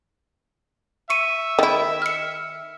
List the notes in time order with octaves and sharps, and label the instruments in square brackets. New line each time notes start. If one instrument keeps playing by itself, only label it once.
[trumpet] E5 [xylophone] C#6 C#7 D#7
[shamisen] D#3 E4
[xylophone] F6 C#7